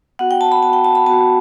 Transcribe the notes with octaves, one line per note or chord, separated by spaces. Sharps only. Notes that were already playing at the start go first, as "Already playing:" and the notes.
B3 F#4 F#5
G5
A5
B5
B3 F#4 A5
G5
A5
B5
B3 F#4 A5